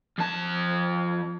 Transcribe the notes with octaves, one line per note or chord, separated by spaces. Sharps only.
F2 A5